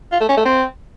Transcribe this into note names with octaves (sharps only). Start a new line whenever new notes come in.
F4
A3
C#4
A3
C4